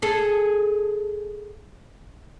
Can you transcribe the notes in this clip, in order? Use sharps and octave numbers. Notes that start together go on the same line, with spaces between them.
G#4 A4